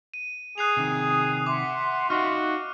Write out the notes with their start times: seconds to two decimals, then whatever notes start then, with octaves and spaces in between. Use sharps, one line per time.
0.14 D#7
0.58 G#4 D#6 F#6 C7 F7
0.77 C3 D#3
1.46 E5 F#5 C6 D6
2.10 D#4 F4 F#4 F6